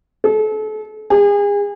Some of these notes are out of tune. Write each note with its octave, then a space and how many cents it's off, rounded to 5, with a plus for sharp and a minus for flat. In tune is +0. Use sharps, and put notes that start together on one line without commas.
A4 -35
G#4 -35